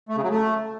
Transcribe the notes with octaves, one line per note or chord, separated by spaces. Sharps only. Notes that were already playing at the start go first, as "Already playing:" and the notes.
A3
C#3
F#3
A3